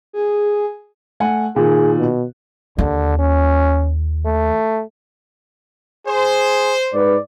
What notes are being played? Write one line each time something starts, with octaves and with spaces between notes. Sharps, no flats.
G#4
A3 F#5 G#5
A#2 D#3 G#4
B2
D#2 D3
C#4
A3
G#4 C5
G#2 B4 D5